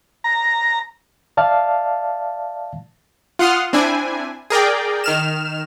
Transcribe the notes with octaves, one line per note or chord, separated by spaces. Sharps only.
A#5
D5 E5 F5 A5
F4 F#5 C6 D#6 F6
C4 D4 E4 G#5
G#4 A#4 D5 G5
D#3 F6 E7